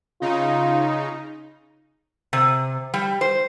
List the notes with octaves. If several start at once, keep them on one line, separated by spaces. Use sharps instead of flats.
C#3 D#4 F4
C3
G3
C5